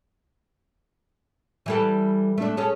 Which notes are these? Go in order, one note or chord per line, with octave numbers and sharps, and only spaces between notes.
E3 G3 A4
A3 D4
C#4 G#4 A4